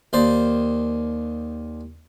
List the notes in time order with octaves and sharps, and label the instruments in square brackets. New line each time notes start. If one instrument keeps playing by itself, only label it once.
[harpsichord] D#2 C5 D5